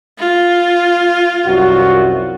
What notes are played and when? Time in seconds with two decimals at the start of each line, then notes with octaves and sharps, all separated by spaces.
0.19 F4
1.46 C2 F#2 F#4